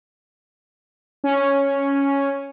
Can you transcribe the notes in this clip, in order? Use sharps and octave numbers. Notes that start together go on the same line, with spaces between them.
C#4